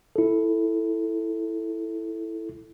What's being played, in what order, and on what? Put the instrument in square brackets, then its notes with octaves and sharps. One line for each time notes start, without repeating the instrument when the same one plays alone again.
[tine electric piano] E4 A4